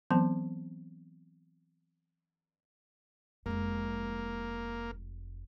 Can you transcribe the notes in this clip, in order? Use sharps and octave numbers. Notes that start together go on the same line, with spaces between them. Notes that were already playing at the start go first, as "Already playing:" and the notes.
E3 F#3 B3 C4 C5 A5
F1 F2 G#3 A#3